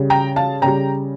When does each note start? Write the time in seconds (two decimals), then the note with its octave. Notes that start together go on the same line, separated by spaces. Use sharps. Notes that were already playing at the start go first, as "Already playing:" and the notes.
Already playing: C#3 G3
0.10 G5 A#5
0.36 F5 A5
0.62 C#3 G3 G5 A#5